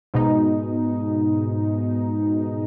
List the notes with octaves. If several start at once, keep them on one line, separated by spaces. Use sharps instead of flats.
G#2 B2 D#4